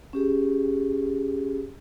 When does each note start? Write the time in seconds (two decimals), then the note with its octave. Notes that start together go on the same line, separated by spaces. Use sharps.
0.13 C#4 G4 G#4